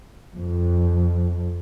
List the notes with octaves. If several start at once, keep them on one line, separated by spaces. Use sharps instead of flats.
F2